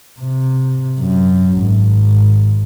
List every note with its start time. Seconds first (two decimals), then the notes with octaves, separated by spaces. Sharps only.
0.20 C3
1.00 F#2
1.60 G#1